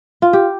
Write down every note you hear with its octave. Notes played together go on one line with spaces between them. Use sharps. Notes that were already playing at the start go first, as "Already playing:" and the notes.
F4
G4